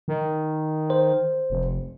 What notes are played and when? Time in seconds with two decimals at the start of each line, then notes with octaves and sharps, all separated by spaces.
0.08 D#3
0.90 C5
1.50 F1